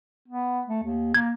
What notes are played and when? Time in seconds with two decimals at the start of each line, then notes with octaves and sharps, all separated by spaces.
0.28 B3
0.67 A3
0.84 D#2
1.14 A#3 G#6